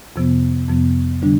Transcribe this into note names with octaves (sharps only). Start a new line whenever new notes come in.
F2 C3 F3 B3
F2 C3 F3 B3
D3 G3 D4